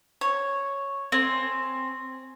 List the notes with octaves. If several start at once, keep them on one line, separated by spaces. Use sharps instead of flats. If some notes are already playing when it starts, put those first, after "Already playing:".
C#5
C4 G#5